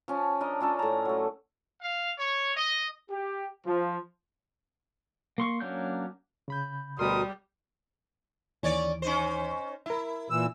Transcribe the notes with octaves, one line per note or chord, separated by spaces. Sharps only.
F3 C#4
D4 A#4 D#5
C#4 F4 A4 D5
A2 A#5
F#3 A3
F5
C#5
D#5
G4
F3
A#3 C6 C#6
F#3 A#3 C#4 D4 G6
C#3 B5 G6
D2 B2 G3 A#4 B5 C6 D#6
D#2 E3 C#4 C#5 D5
C#4 D#4 C5
E4 A#4 E5
A#2 E3 E6